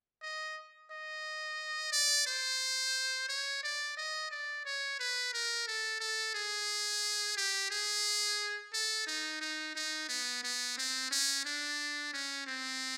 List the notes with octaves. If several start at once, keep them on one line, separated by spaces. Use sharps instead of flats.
D#5
D#5
D5
C5
C#5
D5
D#5
D5
C#5
B4
A#4
A4
A4
G#4
G4
G#4
A4
D#4
D#4
D#4
B3
B3
C4
C#4
D4
C#4
C4